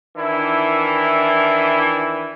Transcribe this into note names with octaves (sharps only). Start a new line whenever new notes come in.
D#3 E3 D4 E4